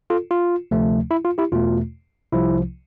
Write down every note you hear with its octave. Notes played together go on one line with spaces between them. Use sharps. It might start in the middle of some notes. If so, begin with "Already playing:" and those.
F4 A4
F4
D2 C3 F3 A3
E4
F4
E4 G4
E2 B2 A3 F4
C2 C3 F3 E4